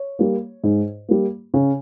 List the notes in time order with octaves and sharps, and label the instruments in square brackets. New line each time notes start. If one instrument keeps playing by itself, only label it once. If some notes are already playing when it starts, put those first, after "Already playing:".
Already playing: [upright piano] C#5
G3 A#3
G#2
G3 A#3
C#3